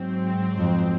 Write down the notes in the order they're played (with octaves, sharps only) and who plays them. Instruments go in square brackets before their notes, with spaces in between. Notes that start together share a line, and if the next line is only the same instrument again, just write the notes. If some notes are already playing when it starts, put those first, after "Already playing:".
Already playing: [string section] G#2 F#3 C4
[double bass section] F2